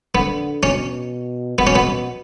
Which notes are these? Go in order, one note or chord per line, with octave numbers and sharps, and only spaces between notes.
D3 B3
B2 C#4
B2 B3
C#4
B3